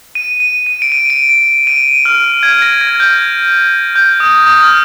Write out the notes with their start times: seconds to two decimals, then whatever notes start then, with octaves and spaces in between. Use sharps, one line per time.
0.15 D#7
0.40 D#7
0.66 D#7
0.82 D7
0.92 D#7
1.10 D7
1.29 D7
1.67 D#7
2.05 F6
2.43 G#6
2.62 A#6
2.81 G#6
3.00 G6
3.96 G6
4.20 D#6
4.46 D#6
4.60 F6